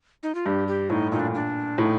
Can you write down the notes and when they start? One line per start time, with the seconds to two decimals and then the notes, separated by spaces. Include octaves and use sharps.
0.23 D#4
0.35 F4
0.46 G2 G4
0.68 G4
0.90 A2 D#4
1.12 A#2 D#4
1.19 D4
1.35 D4
1.78 A2 D#4